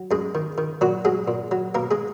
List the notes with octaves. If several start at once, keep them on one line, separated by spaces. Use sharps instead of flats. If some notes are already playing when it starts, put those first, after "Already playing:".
Already playing: F#3
F#2 G#3 G#4
D#3
D#3
A#2 F#3 F#4
F#3 G#3 G#4
A#2
F#3
B2 A#3 A#4
G#3 G#4